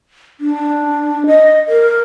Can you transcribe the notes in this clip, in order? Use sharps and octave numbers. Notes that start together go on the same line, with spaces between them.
D4
D#5
A#4